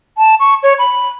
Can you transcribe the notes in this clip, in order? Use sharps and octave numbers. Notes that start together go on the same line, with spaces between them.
A5
C#6
C#5
B5